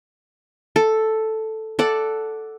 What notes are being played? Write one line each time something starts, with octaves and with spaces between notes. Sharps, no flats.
A4
A4 D5 F#5